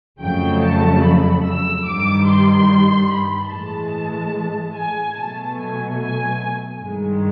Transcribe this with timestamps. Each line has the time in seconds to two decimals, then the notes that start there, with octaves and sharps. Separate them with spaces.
0.21 F2 C#3 F#3 A3 G5
0.62 A5
1.04 B5
1.45 E6
1.86 G2 D#3 G3 D6
2.28 C6
3.11 B5
3.52 A2 E3 G#3 A5
4.76 G#5
5.18 B2 F#3 A3 A5
5.59 G#5
6.01 G#5
6.83 G2 D#3 G#3